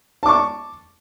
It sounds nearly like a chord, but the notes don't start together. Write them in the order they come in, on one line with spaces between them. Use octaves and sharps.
A5 D6 C#6